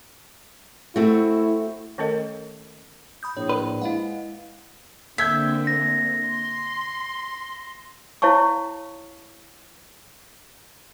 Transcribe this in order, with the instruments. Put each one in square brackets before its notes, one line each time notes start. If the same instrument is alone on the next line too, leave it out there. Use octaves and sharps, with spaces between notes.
[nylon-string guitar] A3 C4 F#4 [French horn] E4
[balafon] D#3 A3 C#4 A4 A#4 D#5
[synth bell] B5 D#6 G6
[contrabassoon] A#1 [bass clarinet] A2 [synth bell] C#5
[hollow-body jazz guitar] B4 [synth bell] D5
[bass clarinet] G#3 [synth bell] E4 F5 F#5
[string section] D3 A#3 C4 [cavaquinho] E5 [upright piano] G6 G#6 B6
[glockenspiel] A#6
[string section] C6
[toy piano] E4 C#5 F5 A5 C#6